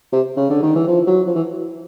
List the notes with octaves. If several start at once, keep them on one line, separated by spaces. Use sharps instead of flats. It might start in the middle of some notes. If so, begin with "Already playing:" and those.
C3
C#3
D3
D#3
E3
F3
F#3
F3
E3